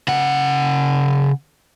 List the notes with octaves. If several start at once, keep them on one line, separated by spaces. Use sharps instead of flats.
C#3 F#5